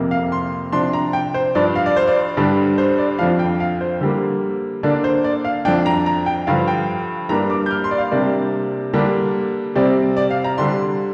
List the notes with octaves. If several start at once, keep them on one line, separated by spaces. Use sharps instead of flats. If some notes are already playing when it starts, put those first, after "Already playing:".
Already playing: F2 C3 A#3
F5
C6
C3 F3 D4 C6
A#5
G5
C5
G2 F3 D4 D5
F5
D5
C5
D5
G2 D3 G3 D4
C5
D5
F2 F3 D4 F5
G5
F5
C5
D3 G3 A#3
D3 A#3 D4 D5
C5
D5
F5
F2 F3 D4 G5
A#5
A#5
G5
G2 D3 F3 F5
G5
G2 G3 A#3 D4 A#5
D6
G6
F6
C6
D5
F5
C3 G3 A#3 D4 D5
D3 G3 A#3 D4
C3 G3 C4 D5
D5
F5
A#5
D3 G3 D4 C6